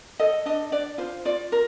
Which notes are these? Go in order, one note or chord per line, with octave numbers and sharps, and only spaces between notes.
A4 D#5
D4 D#5
D4 D5
F4 C5
F4 D5
A#4